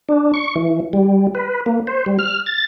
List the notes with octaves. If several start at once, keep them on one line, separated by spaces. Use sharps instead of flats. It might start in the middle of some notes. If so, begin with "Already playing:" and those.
D4
C#6
E3
G3
B4
A#3
C5
G3
F6
A6